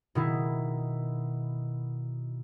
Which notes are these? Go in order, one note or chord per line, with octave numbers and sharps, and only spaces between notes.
B2 D#3 E4